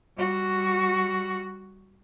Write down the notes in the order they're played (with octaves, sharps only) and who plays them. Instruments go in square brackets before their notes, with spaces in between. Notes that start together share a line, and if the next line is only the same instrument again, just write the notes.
[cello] G3 F#4